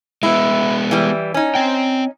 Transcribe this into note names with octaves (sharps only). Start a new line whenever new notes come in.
G#3 B3 E4
E3 G3
C#4 D#4
C4 G5